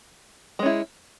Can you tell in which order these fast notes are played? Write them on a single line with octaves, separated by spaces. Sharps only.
G#3 C#4 E4